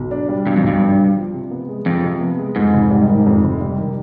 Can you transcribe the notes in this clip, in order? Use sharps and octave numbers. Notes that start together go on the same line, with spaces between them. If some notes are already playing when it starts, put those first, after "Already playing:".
Already playing: B1
D4
G3
G2 B2
F2
B1 G2
D4
G3
F3
C3
B3
G#3
F2 F3
C3
B3
G#3
F2 G#2
F1
G3
D#3
F2
F1
G3
D#3